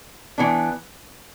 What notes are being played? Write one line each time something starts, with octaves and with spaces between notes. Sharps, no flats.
E3 B3 D4